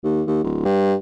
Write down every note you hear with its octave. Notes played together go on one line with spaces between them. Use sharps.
D#2
D#2
D1
G2